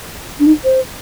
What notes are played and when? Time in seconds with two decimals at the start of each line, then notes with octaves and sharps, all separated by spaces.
0.40 D4
0.46 D#4
0.64 C5